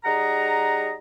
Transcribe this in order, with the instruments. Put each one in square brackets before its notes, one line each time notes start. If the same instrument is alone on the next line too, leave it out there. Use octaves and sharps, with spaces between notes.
[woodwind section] G3 D#4 G#4 F#5 A#5